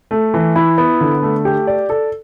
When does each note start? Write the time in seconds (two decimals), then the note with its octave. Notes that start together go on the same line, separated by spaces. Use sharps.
0.11 A3
0.34 E3
0.56 E4
0.78 B3
1.01 D3
1.23 A3
1.45 G4
1.67 D5
1.90 A4